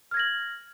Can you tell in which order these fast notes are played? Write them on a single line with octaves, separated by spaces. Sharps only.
F6 G#6 A#6 F#7